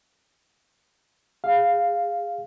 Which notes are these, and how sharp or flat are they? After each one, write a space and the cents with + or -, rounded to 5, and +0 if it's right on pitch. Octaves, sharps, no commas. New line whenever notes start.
G#4 -20 F5 +0